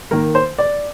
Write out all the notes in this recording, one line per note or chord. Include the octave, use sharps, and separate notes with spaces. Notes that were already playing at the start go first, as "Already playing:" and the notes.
D#3 A#3 A#4
C5
D5